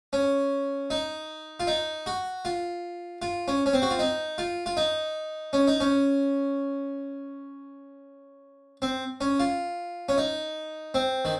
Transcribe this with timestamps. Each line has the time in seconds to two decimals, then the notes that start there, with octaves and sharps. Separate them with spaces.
0.13 C#4
0.90 D#4
1.60 F4
1.67 D#4
2.06 F#4
2.45 F4
3.22 F4
3.48 C#4
3.66 C#4
3.73 C4
3.82 F#4
3.90 F4
3.99 D#4
4.38 F4
4.66 F4
4.77 D#4
5.53 C#4
5.68 D#4
5.80 C#4
8.82 C4
9.21 C#4
9.40 F4
10.09 C#4
10.18 D#4
10.94 C4
11.25 D#3